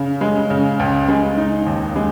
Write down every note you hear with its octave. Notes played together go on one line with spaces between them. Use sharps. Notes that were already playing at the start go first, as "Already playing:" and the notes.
Already playing: C#3
G#3
C#3
C#2
G#3
D#4
D#2
G#3